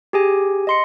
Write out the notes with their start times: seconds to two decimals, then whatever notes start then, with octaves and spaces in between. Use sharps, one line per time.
0.13 G4 G#4 G#5
0.67 D#5 C6 C#7